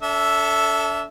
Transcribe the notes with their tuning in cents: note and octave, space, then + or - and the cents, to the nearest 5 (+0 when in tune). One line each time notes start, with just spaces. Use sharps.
D4 -40 A4 +0 E5 +0